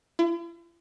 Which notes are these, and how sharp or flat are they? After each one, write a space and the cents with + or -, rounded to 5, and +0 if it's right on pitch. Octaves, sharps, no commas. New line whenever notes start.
E4 +45